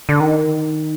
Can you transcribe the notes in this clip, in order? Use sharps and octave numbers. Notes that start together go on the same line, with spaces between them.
D3
D#3